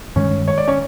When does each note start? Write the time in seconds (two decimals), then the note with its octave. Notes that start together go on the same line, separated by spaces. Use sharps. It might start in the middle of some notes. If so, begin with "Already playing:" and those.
0.16 G2 D#3 G#3 C#4 C#5
0.48 C#5
0.58 D5
0.68 C#4 C#5